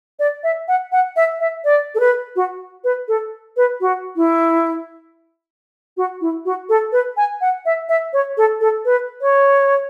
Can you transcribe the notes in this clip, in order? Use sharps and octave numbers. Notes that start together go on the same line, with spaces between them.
D5
E5
F#5
F#5
E5
E5
D5
A4
B4
F#4
B4
A4
B4
F#4
E4
F#4
E4
F#4
A4
B4
G#5
F#5
E5
E5
C#5
A4
A4
B4
C#5